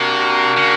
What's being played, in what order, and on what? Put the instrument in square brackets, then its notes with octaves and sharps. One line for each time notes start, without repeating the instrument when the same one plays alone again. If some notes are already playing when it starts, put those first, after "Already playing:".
Already playing: [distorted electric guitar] C3 [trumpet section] A#3 D4 F#4 A#4
[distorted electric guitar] C#3